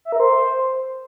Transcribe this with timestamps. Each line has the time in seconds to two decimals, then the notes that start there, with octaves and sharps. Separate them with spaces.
0.05 E5
0.12 A#4
0.20 C5